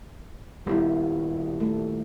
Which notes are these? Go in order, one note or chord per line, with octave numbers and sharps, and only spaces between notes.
D#1 G3 B3 E4
A3